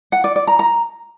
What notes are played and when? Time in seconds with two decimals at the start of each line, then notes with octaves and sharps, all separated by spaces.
0.12 F#5
0.24 D5
0.36 D5
0.47 A#5
0.59 A#5